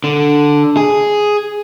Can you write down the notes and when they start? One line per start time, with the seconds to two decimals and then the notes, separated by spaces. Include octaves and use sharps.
0.04 D3
0.77 G#4